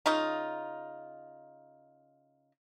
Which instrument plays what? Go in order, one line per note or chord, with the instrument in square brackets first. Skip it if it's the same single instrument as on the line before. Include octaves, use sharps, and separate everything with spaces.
[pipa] C#3 D#4 F4